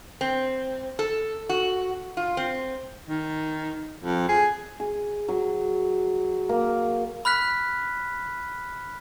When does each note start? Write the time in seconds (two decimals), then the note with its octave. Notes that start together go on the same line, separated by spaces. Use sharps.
0.21 C4
0.99 A4
1.49 F#4
2.17 F4
2.37 C4
3.09 D#3
4.04 F2
4.29 G#4
4.80 G#4
5.29 F#3
6.49 A#3
7.25 B5 F6 F#6 B6